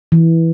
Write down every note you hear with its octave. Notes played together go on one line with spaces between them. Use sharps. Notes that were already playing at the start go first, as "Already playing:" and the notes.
E3